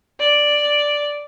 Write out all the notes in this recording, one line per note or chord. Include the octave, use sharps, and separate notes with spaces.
D5